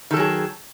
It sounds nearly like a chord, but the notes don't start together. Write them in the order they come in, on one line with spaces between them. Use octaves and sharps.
D#3 A4 F#3 G#4